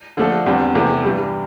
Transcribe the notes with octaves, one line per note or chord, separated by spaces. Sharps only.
D3 F3 A3 D4 A4
E2 D3 G3 C4
E2 C3 E3 A3 E4
G2 E3 G3